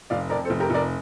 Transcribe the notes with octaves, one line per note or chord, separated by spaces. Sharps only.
F1 D5 F5
F2 A#4 D5
A4 C5
F1
G4 A#4
F1 A#4 D5